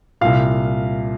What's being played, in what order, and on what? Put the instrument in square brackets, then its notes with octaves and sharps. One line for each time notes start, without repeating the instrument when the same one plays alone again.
[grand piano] C2 A#2 F5